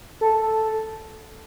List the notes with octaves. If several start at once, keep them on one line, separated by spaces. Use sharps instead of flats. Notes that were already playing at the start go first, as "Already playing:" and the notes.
A4